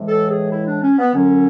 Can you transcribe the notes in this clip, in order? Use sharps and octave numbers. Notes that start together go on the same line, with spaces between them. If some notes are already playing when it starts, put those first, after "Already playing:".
Already playing: A2 E3 G#3
A4
G#4
E4
D4
C#4
B3
F#2 D3 F#3 C#4